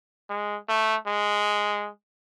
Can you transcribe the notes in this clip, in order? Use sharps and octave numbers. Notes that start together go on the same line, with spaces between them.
G#3
A3
G#3